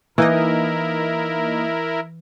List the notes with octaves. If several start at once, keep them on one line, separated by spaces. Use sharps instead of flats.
E3 A#3 D#4 E4 A#4 D#5